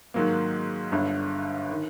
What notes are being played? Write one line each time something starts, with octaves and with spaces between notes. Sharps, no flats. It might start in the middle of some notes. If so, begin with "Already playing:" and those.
G#2 D#3 F#3 A#3
G1 G2 D3
D#3